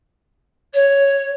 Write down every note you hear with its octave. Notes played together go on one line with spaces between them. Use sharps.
C#5